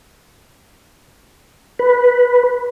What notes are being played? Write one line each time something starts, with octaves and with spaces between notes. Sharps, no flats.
B4